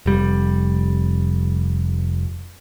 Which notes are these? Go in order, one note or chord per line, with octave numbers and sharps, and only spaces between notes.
F1 G3